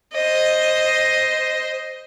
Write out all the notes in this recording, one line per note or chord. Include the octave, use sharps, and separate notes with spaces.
C5 D#5